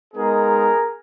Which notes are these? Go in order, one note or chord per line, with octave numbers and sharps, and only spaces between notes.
G#3 B3 D#4 G#4 A#4